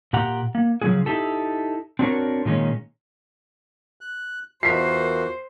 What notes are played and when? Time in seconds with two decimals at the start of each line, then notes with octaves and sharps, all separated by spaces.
0.13 A#2 G4 F#5 A#5
0.55 A#3
0.82 C#3 F3 F#3 B3 F#4 G#4
1.06 D#4 E4 G4 A4
1.99 C4 D4 F#4 G#4 A#4 C#5
2.45 A#2 D#3 G#3 B3 C#4
4.01 F#6
4.63 E2 F4 F#4 A#4 C5 B6 C7